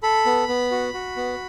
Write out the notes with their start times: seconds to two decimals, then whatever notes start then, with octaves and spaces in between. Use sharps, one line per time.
0.03 A4 B5
0.26 B3
0.48 B3
0.71 F#4
0.94 F#4
1.16 B3